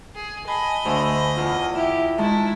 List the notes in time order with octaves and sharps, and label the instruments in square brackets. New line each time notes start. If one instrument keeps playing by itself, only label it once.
[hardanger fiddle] G#4
[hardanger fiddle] D#5 [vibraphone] G#5 A5 [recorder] B5
[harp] D2 D3 E6
E2 F4
[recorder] E4 [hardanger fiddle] G4 [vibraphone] E5
[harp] D#3 G#3 [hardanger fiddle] E4 [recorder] A5